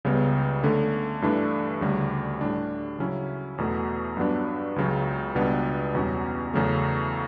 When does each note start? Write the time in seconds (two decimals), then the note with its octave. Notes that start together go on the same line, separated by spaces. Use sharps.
0.05 C#2 C#3 G3 B3
0.63 D3 A3 C#4
1.22 G2 E3 A3 D4
1.81 D2 C#3 G3
2.41 A2 G3 D4
2.99 C#3 F#3 C#4 E4
3.58 E2 B2 A3
4.17 G2 F#3 B3 D4
4.76 C#2 C#3 F#3
5.35 C#2 B2 G3 B3 D4
5.95 E2 B2 G3 C#4
6.54 E2 C#3 F#3 A3